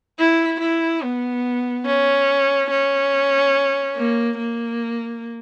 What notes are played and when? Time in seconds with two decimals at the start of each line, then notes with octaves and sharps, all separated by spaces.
0.19 E4
0.61 E4
1.03 B3
1.86 C#4
2.71 C#4
3.96 A#3
4.38 A#3